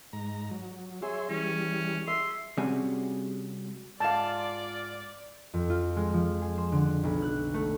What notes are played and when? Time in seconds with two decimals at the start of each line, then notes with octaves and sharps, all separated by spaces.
0.13 G#2 A#5
0.51 F#3
1.02 G#4 C#5 E5 C6
1.30 E3 G3 C#4
2.07 E5 C6
2.57 C3 G3 C#4 F#4 G#4
4.00 G#2 F4 D5 F5 A5
5.54 F2
5.70 F4
5.96 G#3
6.14 F3
6.42 G#4
6.58 C5
6.72 D3
7.03 B1
7.22 F#6
7.54 A3